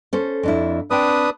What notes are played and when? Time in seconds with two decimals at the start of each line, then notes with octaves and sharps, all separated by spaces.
0.13 C#4 A4 C5
0.43 F2 D4 E4
0.91 C4 D4 B4 G5 D#6